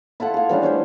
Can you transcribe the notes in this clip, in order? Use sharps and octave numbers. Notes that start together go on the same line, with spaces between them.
E4 F4 A4 F#5
G#4 F5
E3 G3 C#4 D4
A3 C#4 E4 C5